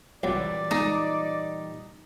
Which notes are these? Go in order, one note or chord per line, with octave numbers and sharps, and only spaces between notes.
C2 A#2 E3 F#3 G3 D5
G#3 D#4